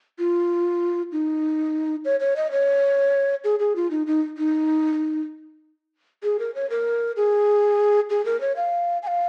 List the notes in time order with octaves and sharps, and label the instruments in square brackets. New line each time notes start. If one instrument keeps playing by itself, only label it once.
[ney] F4
D#4
C#5
C#5
D#5
C#5
G#4
G#4
F4
D#4
D#4
D#4
G#4
A#4
C#5
A#4
G#4
G#4
A#4
C#5
F5
G#5
F5